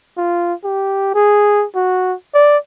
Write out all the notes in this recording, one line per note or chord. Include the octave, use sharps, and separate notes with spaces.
F4
G4
G#4
F#4
D5